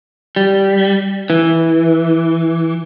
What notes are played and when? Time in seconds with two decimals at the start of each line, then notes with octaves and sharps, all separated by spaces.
0.36 G3
1.30 E3